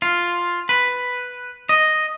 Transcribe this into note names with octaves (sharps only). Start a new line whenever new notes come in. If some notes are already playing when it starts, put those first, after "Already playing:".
F4
B4
D#5